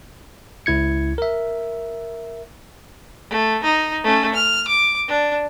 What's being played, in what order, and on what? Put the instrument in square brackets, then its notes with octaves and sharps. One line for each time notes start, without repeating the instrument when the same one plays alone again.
[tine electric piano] C#2 E4 G#6 C#7
A#4 E5
[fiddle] A3
D#4
A3 C#4
F6
D6
D4